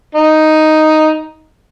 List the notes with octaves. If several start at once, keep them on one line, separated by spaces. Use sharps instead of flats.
D#4